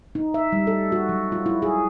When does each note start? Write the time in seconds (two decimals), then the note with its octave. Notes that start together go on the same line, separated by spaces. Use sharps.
0.15 D#4
0.34 E5
0.52 G3
0.67 A4
0.92 F#4
1.09 F#3
1.32 F4
1.46 E4
1.62 G#4